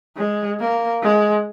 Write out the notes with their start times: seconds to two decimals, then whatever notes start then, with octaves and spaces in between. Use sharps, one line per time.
0.17 G#3
0.60 A#3
1.02 G#3